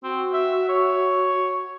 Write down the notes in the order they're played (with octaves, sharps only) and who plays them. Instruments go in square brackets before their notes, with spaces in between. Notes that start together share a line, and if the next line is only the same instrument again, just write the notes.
[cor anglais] C4 [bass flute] F#4
[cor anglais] E5
C#5